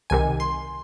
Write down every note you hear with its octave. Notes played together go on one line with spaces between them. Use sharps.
C2 C3 D#3 G#5
C6